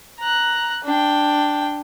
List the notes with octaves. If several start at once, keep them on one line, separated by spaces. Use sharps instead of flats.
A#5 F#6
D4 G5